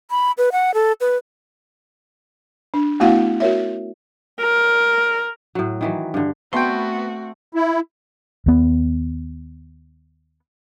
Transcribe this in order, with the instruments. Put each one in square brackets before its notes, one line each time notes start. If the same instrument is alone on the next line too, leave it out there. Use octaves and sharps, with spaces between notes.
[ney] B5
B4
F#5
A4
B4
[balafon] D4
A3 B3 E4 F#4 F5 F#5
F#4 A#4 C#5 E5
[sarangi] A#4
[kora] A2 F#3
D#3 E3 F#3
G2 D3
[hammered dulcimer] A3 C4 [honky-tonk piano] B3 [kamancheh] F#4 [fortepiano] G5 C6
[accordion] E4
[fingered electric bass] D#2 B3